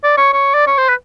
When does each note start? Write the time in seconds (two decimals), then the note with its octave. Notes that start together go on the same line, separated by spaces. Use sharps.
0.04 D5
0.17 C#5
0.33 C#5
0.54 D5
0.67 C#5
0.78 C5
0.89 B4